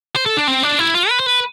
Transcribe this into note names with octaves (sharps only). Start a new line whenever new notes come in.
C5
A4
D4
C4
D4
E4
F4
B4
C5
B4